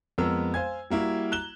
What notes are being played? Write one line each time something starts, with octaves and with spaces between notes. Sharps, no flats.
F2 G#3 B3 A#4 E6
C5 F5 G#5 G#6
G3 A#3 E4 F#4
A#5 F#6 E7 G7